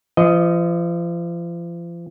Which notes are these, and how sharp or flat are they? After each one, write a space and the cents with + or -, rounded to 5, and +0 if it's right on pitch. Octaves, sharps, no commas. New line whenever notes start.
F3 -40 D#5 +0